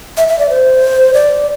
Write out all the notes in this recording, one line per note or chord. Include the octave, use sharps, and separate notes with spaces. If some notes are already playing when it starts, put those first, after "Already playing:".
E5
E5
D5
C5
D5